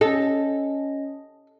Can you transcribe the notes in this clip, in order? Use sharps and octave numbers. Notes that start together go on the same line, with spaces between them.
C#4 A4 D#5